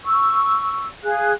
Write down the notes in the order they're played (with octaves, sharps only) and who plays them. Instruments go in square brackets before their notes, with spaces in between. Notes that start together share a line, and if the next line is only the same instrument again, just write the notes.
[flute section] C#6 E6
G#4 F5 F#6